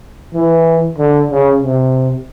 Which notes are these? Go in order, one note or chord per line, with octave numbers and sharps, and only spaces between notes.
E3
D3
C#3
C3